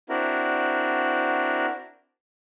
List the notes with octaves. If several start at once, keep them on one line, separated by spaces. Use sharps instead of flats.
C4 D4 E4 F#4 A#4